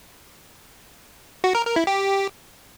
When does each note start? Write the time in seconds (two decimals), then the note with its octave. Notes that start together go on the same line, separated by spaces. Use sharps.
1.44 F#4
1.55 A#4
1.65 A#4
1.76 E4
1.87 G4